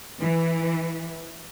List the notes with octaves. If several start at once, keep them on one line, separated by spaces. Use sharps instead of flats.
E3